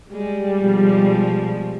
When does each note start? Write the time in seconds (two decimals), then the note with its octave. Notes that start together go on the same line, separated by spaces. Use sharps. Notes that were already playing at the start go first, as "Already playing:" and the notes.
0.11 G3 G#3
0.59 B2 F3 G#3